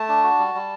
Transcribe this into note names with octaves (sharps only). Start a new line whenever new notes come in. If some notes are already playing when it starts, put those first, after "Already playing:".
Already playing: A3 A5
D4
F#4
G3
G3